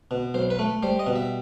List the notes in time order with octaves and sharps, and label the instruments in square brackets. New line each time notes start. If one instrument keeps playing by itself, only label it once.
[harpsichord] B2
B1 C5
B4
A3
G3 C5
D#5
B2
E5